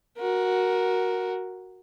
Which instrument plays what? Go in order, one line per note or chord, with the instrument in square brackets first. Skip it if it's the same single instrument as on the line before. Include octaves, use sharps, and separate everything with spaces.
[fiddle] F#4 A#4